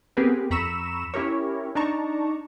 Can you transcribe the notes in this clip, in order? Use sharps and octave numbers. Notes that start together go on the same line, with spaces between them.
B3 C4 G4 G#4 A#4 B4
F2 A#5 B5 C#6 E6 E7
C#4 E4 G4 A#4 C#5
D4 D#4 D5 A5 A#5 C#6